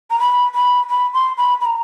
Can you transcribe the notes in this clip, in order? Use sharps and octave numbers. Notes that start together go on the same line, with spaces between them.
A#5
B5
B5
B5
C6
B5
B5
A#5